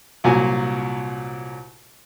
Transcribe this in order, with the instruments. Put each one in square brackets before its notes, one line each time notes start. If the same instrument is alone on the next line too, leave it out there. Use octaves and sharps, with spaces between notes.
[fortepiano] C2 A#2 F#3 G#5